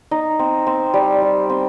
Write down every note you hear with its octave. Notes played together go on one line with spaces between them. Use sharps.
D#4
C4
C4
G3
G3
C4